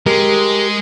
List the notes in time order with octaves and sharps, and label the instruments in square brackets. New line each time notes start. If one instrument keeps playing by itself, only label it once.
[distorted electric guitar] G#3 [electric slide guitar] G4 A#4